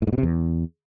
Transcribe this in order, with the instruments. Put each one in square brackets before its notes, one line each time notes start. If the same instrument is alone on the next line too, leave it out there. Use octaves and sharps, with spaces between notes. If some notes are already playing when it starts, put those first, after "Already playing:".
[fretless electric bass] A2
G#2
B2
C3
E2